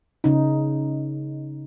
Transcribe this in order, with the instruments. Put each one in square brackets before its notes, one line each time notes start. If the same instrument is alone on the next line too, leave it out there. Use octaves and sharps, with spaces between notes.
[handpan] C#3 D#4